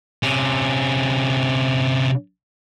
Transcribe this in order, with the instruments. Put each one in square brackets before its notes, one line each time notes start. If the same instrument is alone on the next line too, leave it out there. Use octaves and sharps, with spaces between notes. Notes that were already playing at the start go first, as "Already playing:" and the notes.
[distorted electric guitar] C3 C#4